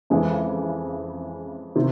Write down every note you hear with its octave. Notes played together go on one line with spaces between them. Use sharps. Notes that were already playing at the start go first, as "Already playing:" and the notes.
F2 C#3 E3 G#3
C3 D#3